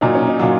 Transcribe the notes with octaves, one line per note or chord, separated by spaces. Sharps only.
A#2 F#3 D#4
C#4
D#4
A#2 F#3 F4